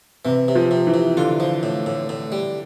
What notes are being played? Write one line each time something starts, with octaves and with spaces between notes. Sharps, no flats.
C3 E3
C3
F3
C3
E3
C3
D3 F4
F3
A2
A2
A2
G3